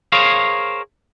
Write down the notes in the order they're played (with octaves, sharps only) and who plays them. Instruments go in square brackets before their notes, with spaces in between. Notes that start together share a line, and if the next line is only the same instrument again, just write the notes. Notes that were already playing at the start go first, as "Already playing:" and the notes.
[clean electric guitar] G#4 A#4 C5 C#5 F5